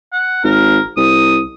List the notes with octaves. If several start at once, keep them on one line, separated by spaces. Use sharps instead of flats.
F#5
G#1 A#4
C2 D#6